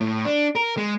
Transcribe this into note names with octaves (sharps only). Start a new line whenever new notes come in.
A2
D4
A#4
G#3